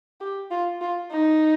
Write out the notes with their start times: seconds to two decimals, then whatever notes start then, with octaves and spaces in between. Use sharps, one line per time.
0.21 G4
0.51 F4
0.81 F4
1.11 D#4